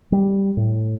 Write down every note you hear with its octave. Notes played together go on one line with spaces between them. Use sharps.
G3
A2